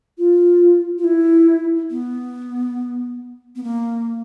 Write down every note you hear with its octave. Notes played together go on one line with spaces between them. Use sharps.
F4
F4
E4
B3
B3
A#3